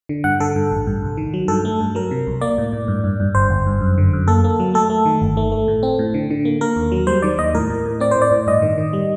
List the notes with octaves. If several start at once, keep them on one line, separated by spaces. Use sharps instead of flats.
D3
G2 F#5
D3 A4
G2
A1
G2
C2
D#3
F#3
G2 A4
A3
G2
F#3 A#4
C3
C2
A#3 D5
A2
A2
G2
G2
G2
G1 C5
G1
G2
F#2
D3
F#2
A#3 A4
A#3
F#3
A3 A4
A3
D#3
G1
A3
A3
A2
C4
A2
D3
D3
A#3
A#3 A#4
D#2
F#3
G3 C5
D#3 D5
D#2 D#5
A2 A#4
A2
A2
C4 D5
A2 C5
D5
A2
G2 D#5
D#3
D#3
G3